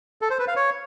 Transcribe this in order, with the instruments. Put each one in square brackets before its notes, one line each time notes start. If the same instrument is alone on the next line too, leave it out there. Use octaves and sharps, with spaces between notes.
[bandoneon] A4
C5
B4
F5
C#5